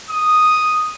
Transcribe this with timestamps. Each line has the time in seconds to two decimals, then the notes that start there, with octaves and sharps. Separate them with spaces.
0.10 D#6